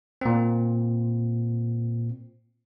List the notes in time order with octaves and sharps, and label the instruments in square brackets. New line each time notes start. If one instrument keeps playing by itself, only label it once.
[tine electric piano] A#2 C4